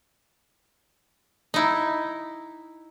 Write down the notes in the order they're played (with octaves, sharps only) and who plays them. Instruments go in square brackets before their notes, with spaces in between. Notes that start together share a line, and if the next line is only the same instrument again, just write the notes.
[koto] D#4 E4